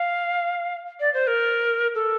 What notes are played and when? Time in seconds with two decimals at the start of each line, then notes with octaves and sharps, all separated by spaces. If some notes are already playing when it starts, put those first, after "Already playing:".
Already playing: F5
1.00 D5
1.14 C5
1.27 A#4
1.95 A4